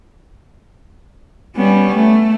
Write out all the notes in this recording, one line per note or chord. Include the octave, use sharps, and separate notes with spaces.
G3 B3 C#4
A3